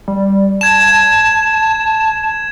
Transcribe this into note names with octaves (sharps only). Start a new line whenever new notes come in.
G3
A5 G#6 E7